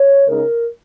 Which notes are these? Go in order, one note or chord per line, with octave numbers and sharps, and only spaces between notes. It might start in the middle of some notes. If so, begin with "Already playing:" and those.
Already playing: C#5
C#3 G#3 D#4 A#4